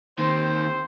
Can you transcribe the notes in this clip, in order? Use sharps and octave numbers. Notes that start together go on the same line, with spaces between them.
D#3 A#3 C4 G4 C5